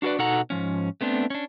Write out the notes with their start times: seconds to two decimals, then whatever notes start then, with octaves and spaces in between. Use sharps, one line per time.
0.02 D4 F#4 A4 B4 D5
0.18 B2 D#4 F#4 A4 F#5 A#5
0.50 G#2 F3 C#4
1.01 A3 B3 C4 D4
1.30 C#4 D4